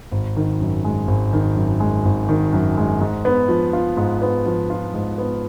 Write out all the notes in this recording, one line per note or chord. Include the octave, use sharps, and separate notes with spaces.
G#1
D#3
F#2
G#3
G#1
D#3
F#2
G#3
G#1
D#3
F#2
G#3
G#2
B3
F3
F4
G#2
B3
F3
F4
G#2
B3